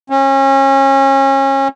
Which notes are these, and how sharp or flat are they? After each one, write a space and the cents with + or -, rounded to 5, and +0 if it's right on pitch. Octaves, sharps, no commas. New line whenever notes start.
C#4 -30